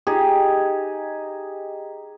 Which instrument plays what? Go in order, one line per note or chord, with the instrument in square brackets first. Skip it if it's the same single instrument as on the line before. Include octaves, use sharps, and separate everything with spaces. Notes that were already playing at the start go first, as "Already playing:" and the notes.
[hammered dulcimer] D#4 G4 G#4